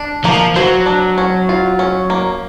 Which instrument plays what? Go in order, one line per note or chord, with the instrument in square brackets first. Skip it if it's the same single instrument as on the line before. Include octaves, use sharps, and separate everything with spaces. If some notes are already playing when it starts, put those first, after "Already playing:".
Already playing: [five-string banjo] D4
[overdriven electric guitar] F3 [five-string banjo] A#3
[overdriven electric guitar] F#3 [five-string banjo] C5
[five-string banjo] D4
C#4
F4
C#4
A#3